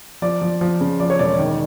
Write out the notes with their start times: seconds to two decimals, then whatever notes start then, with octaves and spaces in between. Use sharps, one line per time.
0.22 F3 D5
0.42 F3
0.61 F3
0.81 C#3
1.00 F3 D5
1.10 C#5
1.19 E1 D5
1.39 D#3